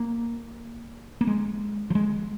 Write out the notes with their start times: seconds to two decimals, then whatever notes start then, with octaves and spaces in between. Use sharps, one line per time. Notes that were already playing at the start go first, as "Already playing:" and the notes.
Already playing: A#3
1.21 A#3
1.27 G#3
1.90 F3
1.95 G#3